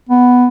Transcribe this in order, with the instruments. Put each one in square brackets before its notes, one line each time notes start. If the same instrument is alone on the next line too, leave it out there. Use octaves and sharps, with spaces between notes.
[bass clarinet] B3